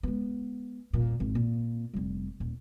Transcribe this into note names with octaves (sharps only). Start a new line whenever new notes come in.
G#3 B3
D#1 A#2
G#1
A#2
F1 G3
D#1